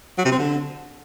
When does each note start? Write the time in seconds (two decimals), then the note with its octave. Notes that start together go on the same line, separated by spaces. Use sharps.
0.18 F#3
0.25 C3
0.32 C4
0.39 D3